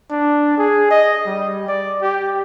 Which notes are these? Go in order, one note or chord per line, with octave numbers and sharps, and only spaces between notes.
D4
G#4
D#5
G3
D5
G4